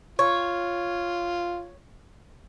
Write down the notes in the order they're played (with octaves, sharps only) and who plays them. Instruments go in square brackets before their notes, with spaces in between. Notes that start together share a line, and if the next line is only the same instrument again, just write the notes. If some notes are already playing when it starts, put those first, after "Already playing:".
[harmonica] F4 [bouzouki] C#5